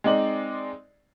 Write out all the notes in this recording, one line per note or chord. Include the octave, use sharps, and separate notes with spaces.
G#3 C4 D#4 D5 F#7